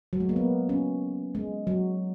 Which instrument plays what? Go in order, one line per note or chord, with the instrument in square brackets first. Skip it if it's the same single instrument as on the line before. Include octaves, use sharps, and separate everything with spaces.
[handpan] F#3
G#3
A#3
B3
C#4
G#3
F#3